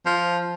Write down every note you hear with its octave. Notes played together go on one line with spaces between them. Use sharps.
F3